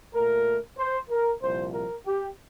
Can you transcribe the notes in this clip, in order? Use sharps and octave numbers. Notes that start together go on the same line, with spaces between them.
A#2 A3 A#4
C5
A#4
C2 A#2 F3 C5
A#4
G4